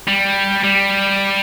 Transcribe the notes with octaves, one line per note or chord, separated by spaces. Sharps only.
G3
G3